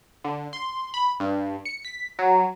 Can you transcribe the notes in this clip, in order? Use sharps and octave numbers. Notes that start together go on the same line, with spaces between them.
D3
C6
B5
G2
C#7
B6
F#3